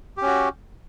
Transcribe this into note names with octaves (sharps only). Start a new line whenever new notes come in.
C#4 F#4 G4